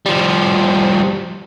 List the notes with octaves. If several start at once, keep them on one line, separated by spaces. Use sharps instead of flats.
F3 G3